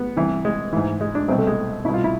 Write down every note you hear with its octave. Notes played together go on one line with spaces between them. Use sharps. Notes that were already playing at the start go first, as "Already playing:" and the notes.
Already playing: B3
C2 C3 E3
G#3
G#2 E3
G#3
D4
C2 B2 C4
A3
G#3
C2 B2 E4
F4
E4